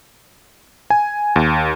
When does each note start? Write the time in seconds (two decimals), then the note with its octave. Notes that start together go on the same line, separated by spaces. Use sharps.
0.90 G#5
1.36 D#2